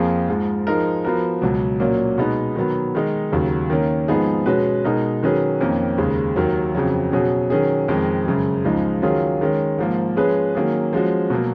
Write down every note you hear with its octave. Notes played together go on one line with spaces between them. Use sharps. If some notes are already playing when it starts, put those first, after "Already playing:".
Already playing: F2 F3 A#3 F4 G#4
G#2 F3 G#3
F3 G#3 D#4 A#4
F3 B3 F#4 A#4
C#2 B2 F#3
A#2 F#3 A#3 C#4
B2 G#3 B3 D#4
D#3 F#3 B3
D#3 G#3 D#4
D#2 C#3 F#3
D#3 A#3 C#4
G#2 F3 B3 D#4 G#4
B2 G#3 C#4 F#4 B4
B2 G#3 D#4 A#4
D#3 F#3 C#4 G#4 B4
F2 D#3 A#3 C#4
D#2 C#3 G#3
D#2 D#3 F#3
F2 C#3 F#3
B2 F#3 C#4 G#4
D#3 F#3 C#4 G#4
F2 D#3 G#3
F#2 C#3 G#3
C#2 C#3 F3 G#3 D#4
D#3 F#3 C#4 F4 G#4
D#3 G#3 C#4
G#2 F3 A#3
F3 G#3 C#4 G#4 B4
D#3 F#3 A#3 C#4 G#4
F3 G#3 C#4 F#4
B2 F#3 A#3